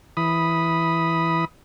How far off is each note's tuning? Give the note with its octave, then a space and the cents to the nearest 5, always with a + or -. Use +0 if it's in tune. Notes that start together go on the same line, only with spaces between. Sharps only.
E3 +0 B5 +0 D#6 +0